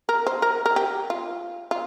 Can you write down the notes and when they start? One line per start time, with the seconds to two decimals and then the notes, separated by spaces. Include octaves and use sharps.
0.09 A#4
0.27 C5
0.42 A#4
0.66 A#4
0.76 G4
1.10 F4
1.71 F4